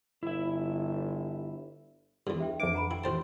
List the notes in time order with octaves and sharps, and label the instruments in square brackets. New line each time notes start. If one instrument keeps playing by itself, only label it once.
[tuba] G1 [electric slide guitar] E4 E5
[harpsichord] E2 G2 [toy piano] D4 G#4 A4
[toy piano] E5 G5
[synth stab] F2 D6 [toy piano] D4 B4 E5
[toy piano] F#5 A#5 B5
[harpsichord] E4 [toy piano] G5
[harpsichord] A1 C5 A5